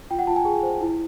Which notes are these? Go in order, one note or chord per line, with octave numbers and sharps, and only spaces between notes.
F4 G5
F#5
F4 A5
G#5
G#4
C5
E4